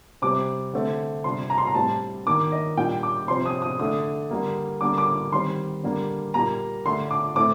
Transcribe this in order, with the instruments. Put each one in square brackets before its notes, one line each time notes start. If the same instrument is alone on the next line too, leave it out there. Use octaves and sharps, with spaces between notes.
[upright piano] C3 G3 C4 D6
D3 A3 C4
C3 G3 D4 C6
A#5
C6
A#5
A2 G3 C4 A5
D#3 A#3 D4 D6
D#5
A#2 G3 D4 G5
D6
C3 F3 C4 C6
D#6
D#6
D3 A3 D4 D#6
D3 G3 A#3
D3 G3 A#3 D4 D6
D6
D#3 G3 C4 C6
D3 G3 A#3 D4
A#2 G3 A#3 A#5
D3 A3 D4 C6
D6
A2 A3 C4 D6